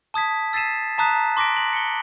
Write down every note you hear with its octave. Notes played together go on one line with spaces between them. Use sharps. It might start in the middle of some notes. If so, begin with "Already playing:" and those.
A5 D#6 G#6 B6
E6 A6 B6 C7 D#7 E7
A5 A#5 D#6 F#6 B6
C6 D6 A#6 B6 D7
F#7
C#7 G7